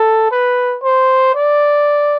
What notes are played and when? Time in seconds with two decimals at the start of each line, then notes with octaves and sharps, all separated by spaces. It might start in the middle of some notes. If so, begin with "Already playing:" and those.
Already playing: A4
0.31 B4
0.83 C5
1.35 D5